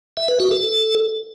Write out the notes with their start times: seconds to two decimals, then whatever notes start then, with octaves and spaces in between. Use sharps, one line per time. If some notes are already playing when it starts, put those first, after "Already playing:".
0.17 E5
0.28 B4
0.40 F#4
0.51 A4